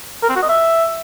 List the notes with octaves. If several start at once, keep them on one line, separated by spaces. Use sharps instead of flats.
A#4
C4
F#4
D#5
E5